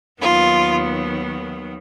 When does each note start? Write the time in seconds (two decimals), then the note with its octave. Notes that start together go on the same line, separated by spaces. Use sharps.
0.21 D#2 D#3 F#3 B3 F4